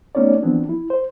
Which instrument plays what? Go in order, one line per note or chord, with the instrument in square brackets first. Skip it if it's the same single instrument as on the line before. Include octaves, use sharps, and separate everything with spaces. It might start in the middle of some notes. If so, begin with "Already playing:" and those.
[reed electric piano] A3 B3 C#4 D#4 C#5 D5
E3 F3 B3 C4 D4
E4
C5